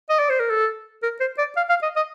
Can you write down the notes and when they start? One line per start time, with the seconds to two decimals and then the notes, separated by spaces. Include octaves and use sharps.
0.10 D#5
0.19 D5
0.30 C5
0.40 A#4
0.50 A4
1.03 A#4
1.20 C5
1.39 D5
1.57 F5
1.70 F5
1.83 D#5
1.97 D#5